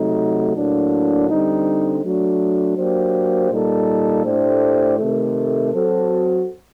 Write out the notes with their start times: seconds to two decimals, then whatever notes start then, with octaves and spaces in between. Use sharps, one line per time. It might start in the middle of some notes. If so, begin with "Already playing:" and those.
Already playing: C3 F#3 A3 D#4
0.55 A2 F#3 A#3 D4
1.28 D3 G3 C4 D#4
2.03 F#3 A3 D4
2.76 F#3 A#3 D4 G4 C5
3.50 A#2 G3 A#3 D#4 A4
4.24 A2 A3 D4 G4 C5
4.98 C3 D#3 A3
5.72 F#3 C4 F#4 A4